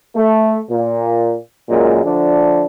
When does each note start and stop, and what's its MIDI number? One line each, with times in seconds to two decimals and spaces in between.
0.15 0.60 57
0.70 1.34 46
1.69 2.03 42
1.69 2.03 46
1.69 2.03 56
2.04 2.65 50
2.04 2.65 53
2.04 2.65 57
2.04 2.65 62